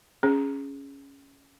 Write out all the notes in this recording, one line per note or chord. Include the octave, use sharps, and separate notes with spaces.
C#4 G#4